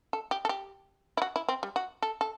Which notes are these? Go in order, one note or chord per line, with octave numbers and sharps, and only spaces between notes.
A4
G4
A4
G4
E4
F#4
E4
C4
G3
F#4
A4
A4